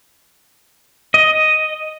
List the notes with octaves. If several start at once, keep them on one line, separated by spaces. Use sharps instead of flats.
D#5